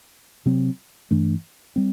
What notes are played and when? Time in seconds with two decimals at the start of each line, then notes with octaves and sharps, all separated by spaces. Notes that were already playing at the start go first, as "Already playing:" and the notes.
0.46 C3 F#3 C4
1.11 G2 E3 A3 D4
1.76 G3 C4